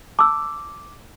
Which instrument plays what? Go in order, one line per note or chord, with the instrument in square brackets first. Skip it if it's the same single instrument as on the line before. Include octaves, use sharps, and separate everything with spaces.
[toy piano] A5 E6 [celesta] D6